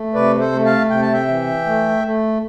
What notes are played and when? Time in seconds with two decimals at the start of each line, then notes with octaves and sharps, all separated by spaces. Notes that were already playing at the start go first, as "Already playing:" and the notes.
Already playing: A3
0.14 C3 B4 D5
0.39 A4 C5
0.52 A3
0.65 F5 A5
0.90 C3 G5
1.01 A5
1.13 E5 G5
1.28 E3
1.66 A3
2.04 A3